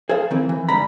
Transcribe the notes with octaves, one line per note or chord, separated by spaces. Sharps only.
G#4 A4 C5 F5
D#3 E3 C4
E3
G#2 D3 G3 A#5 B5